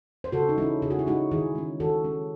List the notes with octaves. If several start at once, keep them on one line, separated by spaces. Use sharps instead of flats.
C5
C#3 F#4 A4
D#4
G#3 C#4 E4
C#3 G#4
F#4
E4
G#3 C#4 D#4 F#4
D#3 E4 G#4
G#3 C#4
D#3 F#4 A4
G#3 C#4